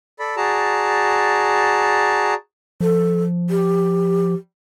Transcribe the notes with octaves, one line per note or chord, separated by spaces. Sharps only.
A4 D5 B5
F#4 G#4 D5 A5 A#5
F3 A4
G4